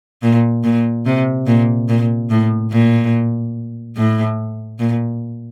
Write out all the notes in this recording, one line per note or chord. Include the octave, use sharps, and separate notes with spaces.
A#2
A#2
C3
A#2
A#2
A2
A#2
A2
A#2